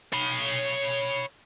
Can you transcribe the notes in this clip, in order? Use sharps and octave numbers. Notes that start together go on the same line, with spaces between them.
C#5 B5